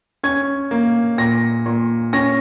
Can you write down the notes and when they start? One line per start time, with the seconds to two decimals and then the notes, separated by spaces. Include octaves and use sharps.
0.23 C#4 G#6
0.71 A#3
1.18 A#2 A#6
1.66 A#2
2.13 C#4 A#6